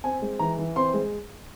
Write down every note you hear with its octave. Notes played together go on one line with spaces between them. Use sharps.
C4 G#5
G#3
E3 A#5
E3
C4 C6
G#3